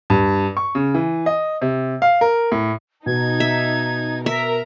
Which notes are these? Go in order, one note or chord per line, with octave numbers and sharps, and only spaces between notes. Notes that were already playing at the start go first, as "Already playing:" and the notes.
G2
C#6
C#3
E3
D#5
C3
F5
A#4
A2
B2 D#4 G#6
E5
A#4 E5 A#5